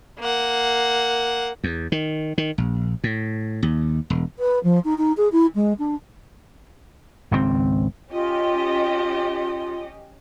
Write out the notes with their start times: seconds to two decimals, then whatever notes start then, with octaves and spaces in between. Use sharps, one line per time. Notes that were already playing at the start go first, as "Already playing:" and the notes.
0.19 A#3 F#5
1.64 E2
1.92 D#3
2.38 D#3
2.58 A#1
3.04 A2
3.63 D#2
4.10 E1
4.38 B4
4.63 F3
4.84 D#4
4.98 D#4
5.17 G#4
5.32 E4
5.55 G#3
5.79 D4
7.31 G#1 C#2 B2 C4
8.12 C#4 F4 G4 D#5